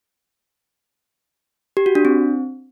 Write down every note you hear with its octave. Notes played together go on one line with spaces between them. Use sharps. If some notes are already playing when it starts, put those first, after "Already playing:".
G4
F#4
D4
C4